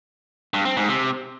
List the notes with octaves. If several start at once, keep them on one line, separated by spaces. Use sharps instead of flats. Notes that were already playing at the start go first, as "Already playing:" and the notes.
G2
C4
G#2
C3